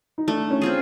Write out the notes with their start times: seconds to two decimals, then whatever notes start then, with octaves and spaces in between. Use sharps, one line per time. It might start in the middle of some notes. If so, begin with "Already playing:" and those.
0.18 D#4
0.28 A3 D4
0.51 C#4
0.61 C4 F4 G#4